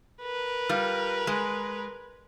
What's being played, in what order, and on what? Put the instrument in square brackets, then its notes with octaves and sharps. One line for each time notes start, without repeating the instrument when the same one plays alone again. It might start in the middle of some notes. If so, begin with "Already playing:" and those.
[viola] A#4 B4
[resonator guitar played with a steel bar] G3 F4
G#3